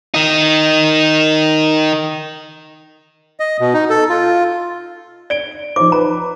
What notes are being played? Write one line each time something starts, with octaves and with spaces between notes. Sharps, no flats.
D#3 D#4
D#5
B2
D#4
A4
F4
D5 D7 G7
F3 D#4 C5 D6
B4 A#5